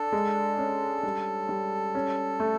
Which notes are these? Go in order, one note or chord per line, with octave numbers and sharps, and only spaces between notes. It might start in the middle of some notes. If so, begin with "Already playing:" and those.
Already playing: D4 A4
G#3
C#4
G3
G3
C#4
A3